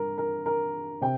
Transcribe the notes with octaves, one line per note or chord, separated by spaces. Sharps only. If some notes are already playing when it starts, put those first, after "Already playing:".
Already playing: G2 A#4
A#4
A#4
C3 G5